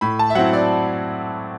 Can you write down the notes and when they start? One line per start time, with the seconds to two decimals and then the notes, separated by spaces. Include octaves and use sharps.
0.01 A2 B5
0.19 A5
0.30 E5
0.35 F#3 C4 E4 F#5
0.53 D5